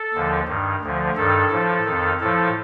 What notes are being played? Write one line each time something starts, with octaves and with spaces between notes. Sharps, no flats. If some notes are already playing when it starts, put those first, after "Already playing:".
Already playing: A4
D#2 D3 F3
G2 D#3
D2 D3 F3
G2 D#3 A4
A2 F3
F2 D#3
A2 F3 A4